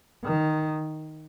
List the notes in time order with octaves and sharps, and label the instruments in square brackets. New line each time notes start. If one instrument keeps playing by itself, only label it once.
[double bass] D#3